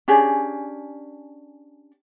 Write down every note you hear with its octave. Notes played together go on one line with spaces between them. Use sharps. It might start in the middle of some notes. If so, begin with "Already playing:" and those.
C#4 D4 G4 G#4